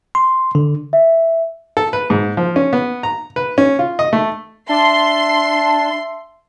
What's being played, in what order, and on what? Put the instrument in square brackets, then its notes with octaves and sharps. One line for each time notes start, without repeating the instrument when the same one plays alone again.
[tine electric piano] C6
D3
[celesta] E5
[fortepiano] A4
B4
G#2
F3
C#4
B3
A#5
B4
C#4
F4
D#5
A3
[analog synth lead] D4 [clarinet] E5 [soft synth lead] A5 [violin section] C6